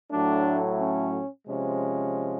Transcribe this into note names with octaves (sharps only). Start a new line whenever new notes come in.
A2 F#3 A3 D4
C#4
C3 F3 G#3 C#4